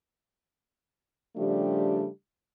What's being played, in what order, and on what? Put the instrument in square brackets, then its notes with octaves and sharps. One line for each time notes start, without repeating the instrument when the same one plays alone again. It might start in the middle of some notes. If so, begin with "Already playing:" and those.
[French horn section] C#3 F3 G3 A3 D4 G4